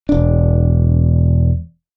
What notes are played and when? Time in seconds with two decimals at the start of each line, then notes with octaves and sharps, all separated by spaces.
0.09 E1 D4